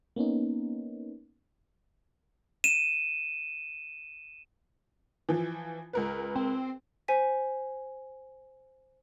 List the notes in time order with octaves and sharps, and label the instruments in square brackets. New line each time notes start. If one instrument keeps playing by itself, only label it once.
[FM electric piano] A#3 B3 C#4 D#4
[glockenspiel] D#7 E7
[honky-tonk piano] E3 F3
C#2 A#4 B4
[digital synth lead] C4
[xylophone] C5 G#5 B6